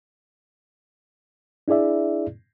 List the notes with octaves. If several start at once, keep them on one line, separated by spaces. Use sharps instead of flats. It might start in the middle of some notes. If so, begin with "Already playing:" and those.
D4 E4 G#4 D5 E5